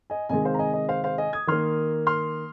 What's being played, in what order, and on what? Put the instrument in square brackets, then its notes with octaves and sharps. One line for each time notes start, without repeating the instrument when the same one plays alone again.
[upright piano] D#5 G#5
C3 D#3 G#3 D#5 G#5
C5 F5
A#5
D#5 G#5
D#5
C5 F5
C5 F5
D#5 G#5
D#6 G#6
D#3 A#3 C6 F6
C6 F6